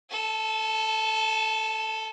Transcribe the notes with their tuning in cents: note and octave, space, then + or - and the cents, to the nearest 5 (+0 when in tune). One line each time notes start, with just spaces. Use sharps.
A4 +0 A5 -40